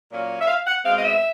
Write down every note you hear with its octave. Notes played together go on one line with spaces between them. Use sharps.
A#2 F#3 A#3 C#4
E5
F5
F#5
B2 G#3 C4 F5
D#5
E5